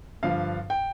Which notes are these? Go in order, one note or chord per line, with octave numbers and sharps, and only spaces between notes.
G2 D3 F3 F5
G5